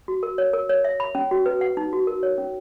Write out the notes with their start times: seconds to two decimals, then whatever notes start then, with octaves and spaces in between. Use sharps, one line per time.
0.08 F#4
0.23 A#4
0.38 C#5
0.53 A#4
0.69 C#5
0.84 E5
1.00 B5
1.15 C#4
1.31 F#4
1.46 B4
1.61 F#5
1.77 D#4
1.93 F#4
2.07 A#4
2.23 C#5
2.38 C#4